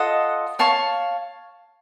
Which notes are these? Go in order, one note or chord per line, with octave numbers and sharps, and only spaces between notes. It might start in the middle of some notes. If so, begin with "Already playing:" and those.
Already playing: F4 A4 D#5 F#5
C#5 F5 A5 C#6